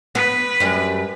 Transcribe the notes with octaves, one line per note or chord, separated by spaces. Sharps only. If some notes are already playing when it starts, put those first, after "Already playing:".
B3 B4
F#2 G3